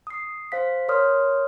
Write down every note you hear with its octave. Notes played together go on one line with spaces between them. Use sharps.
D#6 C7
C5 F5 B6
A#4 C#5 C6 D#6 F6